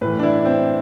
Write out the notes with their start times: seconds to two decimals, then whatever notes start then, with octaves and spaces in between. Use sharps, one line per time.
0.01 A2 E3 B4
0.19 D4
0.23 E4
0.45 C4